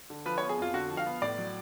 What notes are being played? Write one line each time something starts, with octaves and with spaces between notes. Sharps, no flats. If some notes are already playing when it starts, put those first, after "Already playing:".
D3
F3 B4
B3 C#5
G#4
F2 F4
D3 F#4
F3
F5
B3
A2 D5
F#3